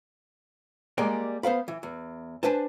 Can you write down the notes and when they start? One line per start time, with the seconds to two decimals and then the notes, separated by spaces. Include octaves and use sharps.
0.98 G3 G#3 A#3 D5 D#5 G#5
1.43 B3 C5 F5 B5
1.68 E3
1.83 E2
2.43 D4 B4 C5 G#5 A5